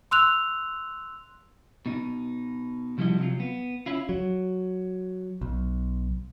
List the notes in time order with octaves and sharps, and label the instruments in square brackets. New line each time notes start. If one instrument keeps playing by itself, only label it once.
[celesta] C6 E6 F#6 F7
[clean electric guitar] B2 D#4
C2 F3 G3 E4 F#4 D#5
C3 F#3 F4
B3
C#4 E4 F4
[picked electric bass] F#3
B1